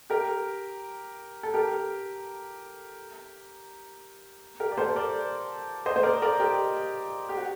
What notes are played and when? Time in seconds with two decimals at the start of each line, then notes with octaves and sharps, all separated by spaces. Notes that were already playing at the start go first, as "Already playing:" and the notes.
0.10 G4 A#4
1.43 A4
1.54 G4 A#4
4.60 G4 A#4
4.72 D5
4.77 A4 C5
4.96 A#4 D5
5.86 C5 D#5
5.96 C5
6.03 A#4 D5
6.22 A#4 D5
6.40 G4 A#4
7.29 G4
7.37 F#4